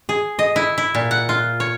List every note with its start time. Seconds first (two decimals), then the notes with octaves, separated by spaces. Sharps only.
0.09 G#4
0.39 D#5
0.56 E4
0.78 E4
0.95 A#2
1.11 F#5
1.29 F4
1.60 C#5